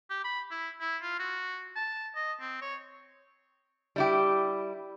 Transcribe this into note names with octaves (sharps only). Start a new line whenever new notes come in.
G4
B5
E4
E4
F4
F#4
A5
D#5
C4
C#5
G3 E4 G4